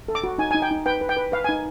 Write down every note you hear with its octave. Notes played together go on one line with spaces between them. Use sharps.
A4
D6
F#4
D#4 G#5
D#4 G#5
G5
D#4
B4 G5
B4
G5
B4
B4 F5
D#4 G#5